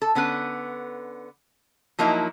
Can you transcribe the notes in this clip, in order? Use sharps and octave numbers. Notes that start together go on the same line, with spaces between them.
A4
D3 B3 C#4 B4
F3 F#3 A#3 D#4 E4